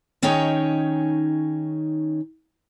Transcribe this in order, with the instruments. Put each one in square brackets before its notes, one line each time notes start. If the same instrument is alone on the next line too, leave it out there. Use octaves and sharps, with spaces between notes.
[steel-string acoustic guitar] D#3 C#4 D#4 G#4 C#5 G5